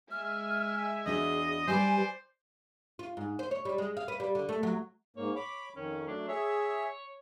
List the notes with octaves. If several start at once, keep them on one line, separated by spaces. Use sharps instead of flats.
G#3 E5 G#5 F6
E2 D4 F#4 G#4 D#5
G3 G4 B4 C5 D5 G#5
F4
G#2
C5
C#5
G3
G#3
F5
B4
G3
D3
A3
F#3
G#2 A#3 C#5
C#5 B5 D6
F2 D#3 C#4
F#3 A3 D4
G#4 C#5 E5